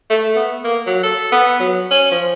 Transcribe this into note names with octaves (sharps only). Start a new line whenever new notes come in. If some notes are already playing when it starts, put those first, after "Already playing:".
A3
B3
A#3
F#3
A4
B3
F#3
C#4
F3